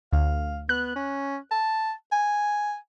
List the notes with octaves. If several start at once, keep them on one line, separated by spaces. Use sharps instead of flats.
D2 F5
B3 F#6
C#4
A5
G#5